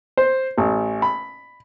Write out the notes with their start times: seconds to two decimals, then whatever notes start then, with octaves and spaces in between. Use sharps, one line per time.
0.17 C5
0.58 A1
1.02 B5